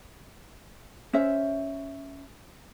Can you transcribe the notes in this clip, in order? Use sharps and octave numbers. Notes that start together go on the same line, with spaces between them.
C#4 C5 E5